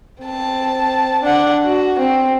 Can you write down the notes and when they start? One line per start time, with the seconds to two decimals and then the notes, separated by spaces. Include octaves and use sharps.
0.22 C4 A5
1.23 D4 F#5
1.64 F#4
1.98 C4